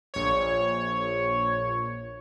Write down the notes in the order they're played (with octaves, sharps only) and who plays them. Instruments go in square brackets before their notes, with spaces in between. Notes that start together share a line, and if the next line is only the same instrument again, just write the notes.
[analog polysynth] A#1 C#5